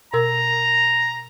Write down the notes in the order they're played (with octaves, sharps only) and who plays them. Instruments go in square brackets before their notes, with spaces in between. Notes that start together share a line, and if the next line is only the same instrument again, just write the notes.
[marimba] B2 A#4 E6 [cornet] A#5